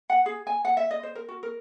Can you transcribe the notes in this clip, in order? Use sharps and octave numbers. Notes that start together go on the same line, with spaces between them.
F#5
G#4
G#5
F#5
E5
D#5
C5
A#4
F#4
A#4